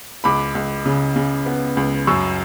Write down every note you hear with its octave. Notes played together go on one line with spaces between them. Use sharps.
C#2 B5 D6
C#2
C#3
C#3
B3
C#2
F#2 C#6 E6